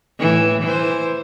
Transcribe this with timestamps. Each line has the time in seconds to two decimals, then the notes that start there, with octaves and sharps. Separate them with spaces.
0.20 A2 E3
0.62 E3 C5